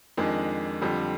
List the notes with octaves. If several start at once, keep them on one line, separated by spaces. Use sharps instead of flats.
F2 D#3 G#3 D4
F2 D3 G3